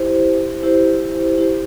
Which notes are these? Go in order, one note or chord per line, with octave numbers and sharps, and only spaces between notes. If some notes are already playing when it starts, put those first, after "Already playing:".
Already playing: E4 G4 C5
E4 G4 C5
E4 G4 C5